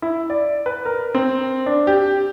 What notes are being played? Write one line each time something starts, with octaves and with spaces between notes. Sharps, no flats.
E4
D5
B4
A#4
C4
D4
G4